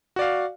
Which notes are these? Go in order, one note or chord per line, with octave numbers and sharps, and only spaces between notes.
F#4 D5 F5